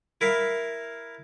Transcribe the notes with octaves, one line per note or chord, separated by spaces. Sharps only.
E4 A#4 E5 F5